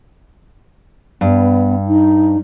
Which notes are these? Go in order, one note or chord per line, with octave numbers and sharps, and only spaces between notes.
G2 B3
D#4